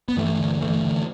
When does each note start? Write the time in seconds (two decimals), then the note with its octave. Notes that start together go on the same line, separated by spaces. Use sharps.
0.08 B3
0.17 G2 E3 A3
0.39 D3
0.61 G2 E3 A3
0.83 D3